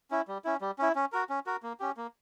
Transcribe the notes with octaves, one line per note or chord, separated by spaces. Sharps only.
C#4 E4
G3
C#4 E4
G3
C#4 E4
C#4
F#4 A#4
C#4
F#4 A#4
A#3
C#4 G4
A#3